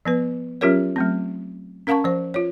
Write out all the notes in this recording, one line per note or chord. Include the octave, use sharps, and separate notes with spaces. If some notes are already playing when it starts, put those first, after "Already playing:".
F3 B3 B4
F#3 C#4 F4 G4 A#4 C#5
F#3 A3 C4
C#4 A#4 F5 F#5 A5 C#6
F3 C5
F4 C#5